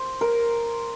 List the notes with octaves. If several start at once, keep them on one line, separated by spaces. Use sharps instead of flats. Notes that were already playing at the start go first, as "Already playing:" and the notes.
Already playing: C5
A#4